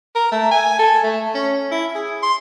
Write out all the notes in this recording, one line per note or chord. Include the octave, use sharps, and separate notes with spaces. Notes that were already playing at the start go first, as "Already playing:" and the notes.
A#4
A3
G#5
A4
A3
C#4
E4
G#4
C6